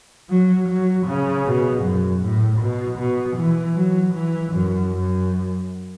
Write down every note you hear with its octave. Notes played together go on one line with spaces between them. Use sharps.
F#3
F#3
C#3
B2
F#2
A2
B2
B2
E3
F#3
E3
F#2
F#2